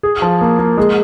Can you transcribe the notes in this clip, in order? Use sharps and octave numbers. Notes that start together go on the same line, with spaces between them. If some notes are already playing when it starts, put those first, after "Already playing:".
G#4
F3
A#3
A#3
G#3